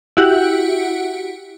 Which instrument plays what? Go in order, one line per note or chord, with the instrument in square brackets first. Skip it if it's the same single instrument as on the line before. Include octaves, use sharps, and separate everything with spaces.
[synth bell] E4 F#4 G4 F#5